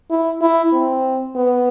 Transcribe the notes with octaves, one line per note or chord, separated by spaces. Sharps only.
E4
E4
C4
B3